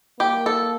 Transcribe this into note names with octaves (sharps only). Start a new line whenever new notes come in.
A#3 G4
A4